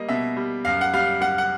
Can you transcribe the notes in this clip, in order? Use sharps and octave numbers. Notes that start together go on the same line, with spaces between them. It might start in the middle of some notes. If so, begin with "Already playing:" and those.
Already playing: G3 A#3 D#5
B2 E5
G3
F#2 F5
F#5
G3 F5
G3 F#5
F#5